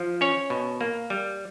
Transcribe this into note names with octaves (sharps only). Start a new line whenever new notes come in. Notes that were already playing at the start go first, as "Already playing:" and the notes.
Already playing: F3
C#4 C#5
B2
A#3
G3